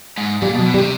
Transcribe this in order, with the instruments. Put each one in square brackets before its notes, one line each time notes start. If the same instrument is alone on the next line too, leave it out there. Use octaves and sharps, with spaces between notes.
[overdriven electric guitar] G#2
[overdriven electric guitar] A#2 [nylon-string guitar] G3
[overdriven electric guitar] B2
[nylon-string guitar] F#3
[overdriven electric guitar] B2
[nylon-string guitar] G3
[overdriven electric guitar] C3